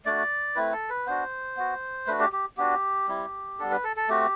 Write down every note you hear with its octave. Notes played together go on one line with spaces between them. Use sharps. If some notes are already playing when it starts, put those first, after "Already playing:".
A3 D4 F#4 D5
A3 C4 E4 B4
A4
B4
B3 D4 F#4 C5
B3 F#4
A3 D4 F#4 B4
G4
G4
B3 D4 F#4 G4
G3 C4 E4
G3 B3 D4 A4
B4
A4
A4
A3 C4 F#4 G4